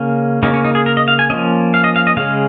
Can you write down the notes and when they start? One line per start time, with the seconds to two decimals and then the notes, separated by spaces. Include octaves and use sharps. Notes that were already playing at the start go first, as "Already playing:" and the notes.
Already playing: C#3 A#3 C#4
0.43 C#3 A#3 C#4 D#4
0.54 C#4
0.64 D#4
0.75 G#4
0.86 A#4
0.97 D#5
1.08 F5
1.19 G#5
1.30 F3 A#3 C#4 D#5
1.74 F5
1.84 D#5
1.96 F5
2.07 D#5
2.17 C#3 G#3 C#4 F5